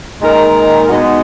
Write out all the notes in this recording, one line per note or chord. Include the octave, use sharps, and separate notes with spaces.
A#2 G#3 D#4 A#4
G#3 B3 D#4 F#4